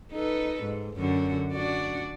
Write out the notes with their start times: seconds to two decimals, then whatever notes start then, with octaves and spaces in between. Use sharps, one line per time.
0.12 D#4 A4 B4
0.63 G#2
0.98 F#2 D3 F#4
1.53 D4 F#4 D5